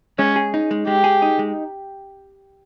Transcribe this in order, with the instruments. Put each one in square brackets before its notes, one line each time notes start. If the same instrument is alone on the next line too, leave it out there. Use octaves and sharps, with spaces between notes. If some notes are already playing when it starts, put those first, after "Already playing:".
[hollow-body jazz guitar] G#3 [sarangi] C#4
[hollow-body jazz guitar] G#4
D#4
G#3
[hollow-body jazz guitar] G#3 [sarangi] G4
[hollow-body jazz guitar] G#4
D#4
G#3